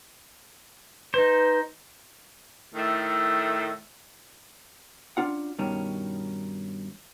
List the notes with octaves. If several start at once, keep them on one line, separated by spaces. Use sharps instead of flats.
D#4 B4 C5
A2 D#3 A3
C#4 D4 F4 F#5
G2 B2 D#3 C#4